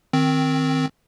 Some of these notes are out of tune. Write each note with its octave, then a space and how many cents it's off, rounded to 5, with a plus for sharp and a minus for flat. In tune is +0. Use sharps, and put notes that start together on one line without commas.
D#3 +0 C4 +0